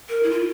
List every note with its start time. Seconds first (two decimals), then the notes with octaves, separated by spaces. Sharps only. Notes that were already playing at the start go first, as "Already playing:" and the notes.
0.09 A#4
0.23 E4
0.30 F4